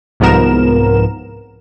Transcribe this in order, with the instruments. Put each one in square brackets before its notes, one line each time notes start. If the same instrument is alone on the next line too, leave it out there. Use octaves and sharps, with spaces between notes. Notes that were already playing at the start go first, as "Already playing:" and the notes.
[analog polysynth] C2 G#2 F3 B3 A#4 E7